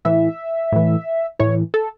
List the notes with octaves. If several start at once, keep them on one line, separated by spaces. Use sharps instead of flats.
A2 E3 E5
A2 E3
A2 E3 C#5
A4